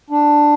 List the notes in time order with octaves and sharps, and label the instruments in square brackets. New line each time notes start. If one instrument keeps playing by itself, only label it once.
[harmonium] D4